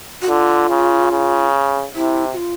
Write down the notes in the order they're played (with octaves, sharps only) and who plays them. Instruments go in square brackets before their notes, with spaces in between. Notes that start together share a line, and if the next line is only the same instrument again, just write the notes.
[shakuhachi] F#4
[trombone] D3 [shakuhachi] F4
[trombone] C#3
C#3
[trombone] C3 [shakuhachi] E4
[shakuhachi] F#4
F4